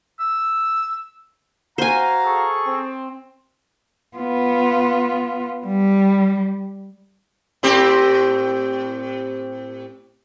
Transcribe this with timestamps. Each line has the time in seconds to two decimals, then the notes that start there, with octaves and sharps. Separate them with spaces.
0.20 E6
1.78 F#4 C5 F5 G#5 A#5
2.25 G#4 A4 C#6
2.67 C4
4.17 B3 F4
5.67 G3
7.63 A2 C4 G4